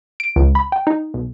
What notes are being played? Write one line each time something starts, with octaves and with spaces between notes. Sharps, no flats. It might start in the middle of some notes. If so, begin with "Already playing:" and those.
D7
C#2
B5
G5
D#4
B1